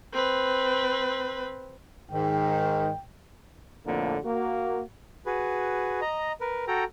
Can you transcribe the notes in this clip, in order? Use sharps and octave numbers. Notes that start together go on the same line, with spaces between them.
C4 B4
G#2 D#3 G5
F2 A2 D3 A#3
A#3 F#4
F#4 G#4 B4
D#5 A#5
A#4 B4
F#4 A4 G5 A#5